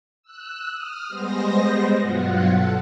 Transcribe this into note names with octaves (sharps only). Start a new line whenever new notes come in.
E6 F#6
D#6 F6
G3 G#3 B3 C5 D#5 A#6
G2 B2 F#3 F4 F#5
A4 F#5